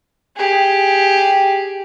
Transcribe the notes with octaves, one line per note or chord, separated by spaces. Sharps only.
G4 G#4